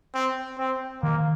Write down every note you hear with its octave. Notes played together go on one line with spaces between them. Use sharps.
C4
C4
D#3 A#3